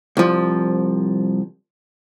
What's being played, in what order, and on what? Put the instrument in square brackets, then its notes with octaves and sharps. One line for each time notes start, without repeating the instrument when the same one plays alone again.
[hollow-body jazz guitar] C2 F3